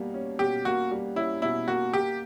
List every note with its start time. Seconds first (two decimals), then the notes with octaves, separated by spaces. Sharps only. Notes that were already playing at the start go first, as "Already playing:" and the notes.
Already playing: B2 G3 A#3
0.14 C#4
0.39 B2 G4
0.65 A#3 F#4
0.91 G3
1.16 C#4 E4
1.42 B2 E4
1.67 A#3 F#4
1.93 A#3 G4